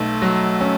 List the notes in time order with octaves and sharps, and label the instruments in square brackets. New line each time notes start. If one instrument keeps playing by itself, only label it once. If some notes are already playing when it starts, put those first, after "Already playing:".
Already playing: [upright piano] B1 [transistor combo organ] A3
[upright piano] F#3
C#4